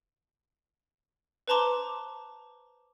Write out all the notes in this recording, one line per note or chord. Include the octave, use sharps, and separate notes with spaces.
B4 C5 A5 A#5 C6 D6